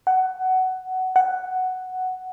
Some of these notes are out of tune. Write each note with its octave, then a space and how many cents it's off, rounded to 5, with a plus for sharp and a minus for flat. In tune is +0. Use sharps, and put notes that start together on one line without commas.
F#5 +15
F#5 +5